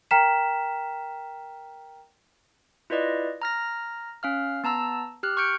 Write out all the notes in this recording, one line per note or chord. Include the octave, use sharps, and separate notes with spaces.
A#4 G5 A#5 F6 B6 E7
E4 F4 B4 D5 D#5
A#5 F6 A#6
C#4 F5 F6
B3 A5 A#5 E6
G4 F6 F#6
C#6 F6 G6 C#7 D7